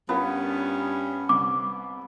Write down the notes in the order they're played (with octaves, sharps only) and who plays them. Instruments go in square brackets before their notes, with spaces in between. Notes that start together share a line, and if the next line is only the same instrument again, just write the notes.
[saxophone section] G2 C#4 [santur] B3 [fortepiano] F4 A#4
[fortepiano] C2 [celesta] D6